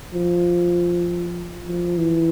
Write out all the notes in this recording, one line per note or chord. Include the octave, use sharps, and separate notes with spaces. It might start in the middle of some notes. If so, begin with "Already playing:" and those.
F3
F3
E3